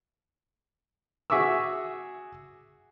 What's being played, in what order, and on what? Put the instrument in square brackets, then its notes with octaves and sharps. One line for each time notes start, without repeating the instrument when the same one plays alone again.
[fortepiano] F#4 G#4 E5 C#6 D6 E6